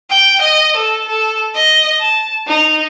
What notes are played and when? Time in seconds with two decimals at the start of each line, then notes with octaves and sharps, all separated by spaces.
0.10 G5
0.41 D#5
0.76 A4
1.07 A4
1.55 D#5
2.00 A5
2.47 D#4